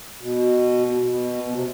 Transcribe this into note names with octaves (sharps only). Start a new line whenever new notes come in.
B2
B2
B2
C3